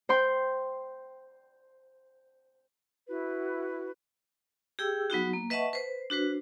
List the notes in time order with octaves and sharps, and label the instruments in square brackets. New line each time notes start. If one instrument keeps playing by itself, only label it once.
[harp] C5 G5 C6
[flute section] E4 F#4 B4
[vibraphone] G4 G#4 G5 E6
F#3 B3 D#4 F#4
A#3
B4 D#5 E5 F#5 A5 C#6
B4 C5
D4 F#4 B4 C5